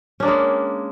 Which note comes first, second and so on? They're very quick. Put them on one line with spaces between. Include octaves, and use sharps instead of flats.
C#4 D4 A#3 G#3